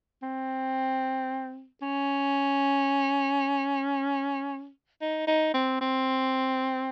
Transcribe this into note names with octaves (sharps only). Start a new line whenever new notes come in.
C4
C#4
D#4
D#4
C4
C4